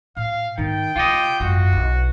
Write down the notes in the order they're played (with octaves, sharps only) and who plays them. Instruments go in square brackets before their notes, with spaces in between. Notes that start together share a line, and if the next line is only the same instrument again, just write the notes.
[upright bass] A2 [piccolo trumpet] F5
[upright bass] G#2 B3 [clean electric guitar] D#3 [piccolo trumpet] G5
[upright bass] C3 G#3 [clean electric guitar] F4 G4 D#5
[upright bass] G#1 F#2 [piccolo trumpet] F#4
[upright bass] B1 E4